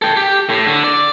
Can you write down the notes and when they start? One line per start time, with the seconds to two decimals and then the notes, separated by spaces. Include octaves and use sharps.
0.02 A4 G5
0.17 G4
0.49 A2
0.67 D3
0.84 D5